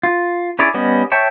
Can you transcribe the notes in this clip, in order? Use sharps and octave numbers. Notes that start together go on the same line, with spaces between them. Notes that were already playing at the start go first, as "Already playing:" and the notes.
F4
C#4 E4 G#4 C#5 D5
G3 B3 C#4 D#5
C#5 E5 G5 A5 C#6